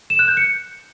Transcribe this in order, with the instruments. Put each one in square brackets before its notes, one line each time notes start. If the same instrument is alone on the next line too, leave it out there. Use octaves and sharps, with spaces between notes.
[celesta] E7
F#6
G6
C#7